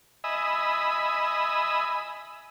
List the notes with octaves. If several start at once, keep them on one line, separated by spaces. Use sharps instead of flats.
D#5 E5 G#5 B5 D#6 E6